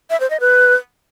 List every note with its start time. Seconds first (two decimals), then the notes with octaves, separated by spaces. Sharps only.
0.10 E5
0.20 C5
0.30 D#5
0.40 B4